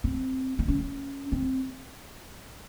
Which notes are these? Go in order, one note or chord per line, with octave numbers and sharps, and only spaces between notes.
C4
C4
C#4
C4